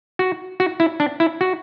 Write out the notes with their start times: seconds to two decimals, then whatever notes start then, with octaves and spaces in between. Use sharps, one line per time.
0.19 F#4
0.60 F#4
0.80 E4
1.00 D4
1.20 E4
1.41 F#4